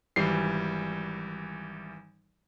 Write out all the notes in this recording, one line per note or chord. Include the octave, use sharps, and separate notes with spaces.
G#1 E3 G3 C7